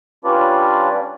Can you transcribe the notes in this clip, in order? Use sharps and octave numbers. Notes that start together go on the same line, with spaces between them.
G3 C#4 D4 F4 B4 D5